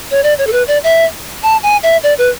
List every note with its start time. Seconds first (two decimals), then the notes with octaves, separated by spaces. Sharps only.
0.11 C#5
0.23 D5
0.38 C#5
0.47 A4
0.53 B4
0.68 D5
0.84 E5
1.43 A5
1.63 G#5
1.83 E5
2.03 D5
2.18 B4